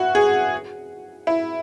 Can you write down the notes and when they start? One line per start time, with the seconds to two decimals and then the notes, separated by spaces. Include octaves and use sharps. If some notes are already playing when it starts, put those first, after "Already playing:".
Already playing: E4 F#4
0.15 G#4
1.27 E4